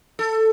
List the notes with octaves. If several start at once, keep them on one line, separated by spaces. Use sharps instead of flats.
A4